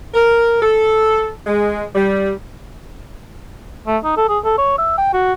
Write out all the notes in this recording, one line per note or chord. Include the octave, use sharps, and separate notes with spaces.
A#4
A4
G#3
G3
A3
D#4
A4
G#4
A4
C#5
E5
G5
F#4